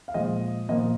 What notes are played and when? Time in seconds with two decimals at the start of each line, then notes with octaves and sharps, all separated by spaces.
0.08 F5
0.14 A#2 F3 G#3 D#5
0.69 A#2 F3 A#3 D#5